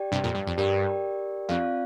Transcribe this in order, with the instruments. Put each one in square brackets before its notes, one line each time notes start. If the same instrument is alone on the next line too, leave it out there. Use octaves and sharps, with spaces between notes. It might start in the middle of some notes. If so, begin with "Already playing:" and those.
Already playing: [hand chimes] G4 D5 G5
[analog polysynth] G2 C3
F2 A#2
G2
F2
[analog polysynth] G2 [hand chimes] G4 A#4 D5 G5
[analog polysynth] F2 [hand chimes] C4 F4 D5 F5